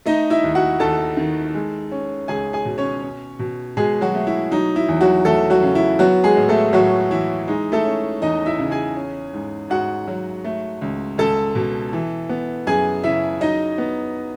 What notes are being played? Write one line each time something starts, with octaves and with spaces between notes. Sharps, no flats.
A3 D#4 D#5
E4 E5
D#2
F#4 F#5
D#2 A4 A5
D#3
G#3
C#4
C#2 G#4 G#5
G#4 G#5
B2
C#4 C#5
C#4
B2
B2 G#3 G#4
F#3 F#4
A3
E4
F#3 D#4
E4
E2
F#3 F#4
E2 A3 A4
F#3 F#4
C#3
E4
F#3 B3 F#4
G#3 G#4
A2
A3 A4
A2 F#3 F#4
E3 E4
G#3 D#4
A3 A4
C#4
E2 D#4 D#5
E4 E5
C#3
G#4 G#5
C#4
G#2
G#2 F#4 F#5
F#3
A3
C#2
C#2 A4 A5
B2
E3
B3
F#2 G#4 G#5
C#3 E4 E5
F#3 D#4 D#5
B3